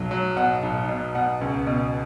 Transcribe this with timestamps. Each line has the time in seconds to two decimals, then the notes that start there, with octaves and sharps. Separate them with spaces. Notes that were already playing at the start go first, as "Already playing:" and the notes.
Already playing: B1 F#3
0.11 F#3
0.37 B2 F#5
0.63 B1
0.88 B2
1.15 B2 F#5
1.41 C#2
1.67 B2